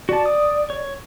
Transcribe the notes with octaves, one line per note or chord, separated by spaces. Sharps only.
F#4 D5 A5
D#6
C#5